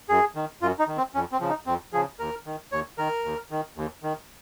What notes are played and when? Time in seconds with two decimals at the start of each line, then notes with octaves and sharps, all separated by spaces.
0.09 F#2 G#4
0.35 D#3
0.62 F#2 F4
0.79 D#4
0.88 D#3
0.97 C4
1.15 F2 C#4
1.32 C4
1.40 C#3 F3
1.49 D#4
1.66 F2 C4
1.93 C#3 F3 G#4
2.19 D#2 A#4
2.46 D#3
2.72 D#2 C#5
2.98 D#3 A#4
3.25 D#2
3.51 D#3
3.77 D#2
4.03 D#3